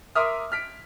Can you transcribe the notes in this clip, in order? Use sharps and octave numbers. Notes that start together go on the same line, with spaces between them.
A#4 E5 C6 D6 D#6 F6
F6 B6 D7